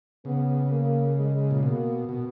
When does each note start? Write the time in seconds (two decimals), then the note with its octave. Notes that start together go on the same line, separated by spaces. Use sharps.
0.25 C#3 B3
0.71 A#3
1.17 G#3
1.51 A#2
1.63 B2 A#3
2.09 B2